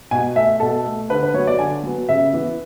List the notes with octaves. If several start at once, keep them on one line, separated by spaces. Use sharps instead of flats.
B2 G#5
A3 E5
B2 A4
A3
D3 B4
B4
F#3 B3 C#5
D5
D3 G#5
F#3 B3
C#3 E5
E3 B3